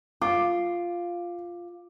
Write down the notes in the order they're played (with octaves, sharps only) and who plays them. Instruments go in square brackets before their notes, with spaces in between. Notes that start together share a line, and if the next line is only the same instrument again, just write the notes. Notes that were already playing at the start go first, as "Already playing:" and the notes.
[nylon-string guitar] F4 [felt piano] D6